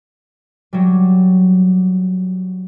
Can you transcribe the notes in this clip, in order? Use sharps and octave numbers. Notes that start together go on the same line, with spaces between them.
F#3 G3